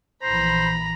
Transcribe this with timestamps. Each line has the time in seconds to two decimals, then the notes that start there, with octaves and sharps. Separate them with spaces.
0.23 A#1 E3 C5 A#5 B5